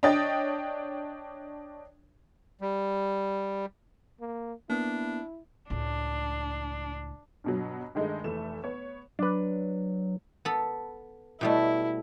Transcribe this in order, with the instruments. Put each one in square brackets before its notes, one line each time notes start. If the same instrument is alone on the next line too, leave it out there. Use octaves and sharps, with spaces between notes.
[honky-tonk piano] D4 C#5 D#5 G5 A6
[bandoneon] G3
[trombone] A#3
[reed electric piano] A#3 B3 [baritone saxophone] D4 [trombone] E4
[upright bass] C#2 A2 [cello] D4
[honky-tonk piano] G2 B2 F#3
G2 D#3 G#3 A3 D#4
F1 E3 A3 E7
B3 C#5
[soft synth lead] F#3 [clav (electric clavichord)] D4 B4
[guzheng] B3 A4
[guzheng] B2 G3 A3 [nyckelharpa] E4